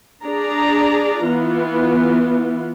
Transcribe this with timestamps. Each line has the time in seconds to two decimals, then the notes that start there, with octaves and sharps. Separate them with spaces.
0.25 D4 G#4 D5 A#5
1.26 E3 B3 F4